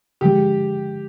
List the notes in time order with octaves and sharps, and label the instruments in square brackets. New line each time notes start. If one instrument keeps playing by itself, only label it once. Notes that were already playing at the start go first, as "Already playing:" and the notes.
[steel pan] D3 F3 G#3 [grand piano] G4